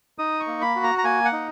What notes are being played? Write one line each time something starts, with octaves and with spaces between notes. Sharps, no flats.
D#4 D#6
C#6
A#3
B5
F#4
A#5
A#5
A#3 G#5
F#5
D#4